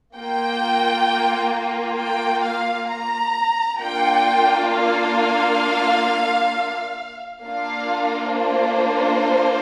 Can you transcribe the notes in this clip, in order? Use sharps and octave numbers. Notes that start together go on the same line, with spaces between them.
A#3 F4 G5
G5
F5
A#5
A#3 D4 F4 G5
F5
A#3 D4 F4 F5
C5